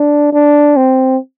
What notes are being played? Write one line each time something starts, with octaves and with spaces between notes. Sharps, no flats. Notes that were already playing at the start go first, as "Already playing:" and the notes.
Already playing: D4
D4
C4